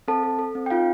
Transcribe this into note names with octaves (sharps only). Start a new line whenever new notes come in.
C4 A4 A5
A4
A4
C4
G5
D#4 F4 F5